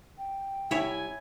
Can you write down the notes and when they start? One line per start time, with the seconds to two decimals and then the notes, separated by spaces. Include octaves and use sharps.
0.18 G5
0.71 C2 E4 C#5 E5 G#5 B5